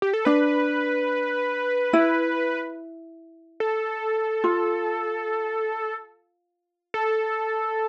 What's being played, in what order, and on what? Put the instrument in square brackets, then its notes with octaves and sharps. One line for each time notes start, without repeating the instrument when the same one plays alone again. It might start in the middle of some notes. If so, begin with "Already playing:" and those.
[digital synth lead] G4
A4
[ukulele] D4 [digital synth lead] B4
[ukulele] E4
[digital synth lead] A4
[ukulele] F4
[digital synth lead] A4